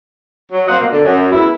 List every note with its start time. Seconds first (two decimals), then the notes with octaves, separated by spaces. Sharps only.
0.52 F#3
0.68 A#3 C4 C5 D#5 F#5
0.80 B2 A#3
0.92 D3
1.05 F#2
1.32 G#3 B3 E4